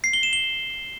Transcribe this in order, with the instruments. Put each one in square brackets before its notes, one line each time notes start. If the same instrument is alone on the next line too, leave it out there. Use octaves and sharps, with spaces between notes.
[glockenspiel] C7
G7
E7
G7